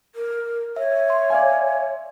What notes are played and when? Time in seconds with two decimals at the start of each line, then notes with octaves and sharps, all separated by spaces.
0.15 A#4
0.76 C#5 E5
1.08 E5 C6
1.30 D5 F5 G#5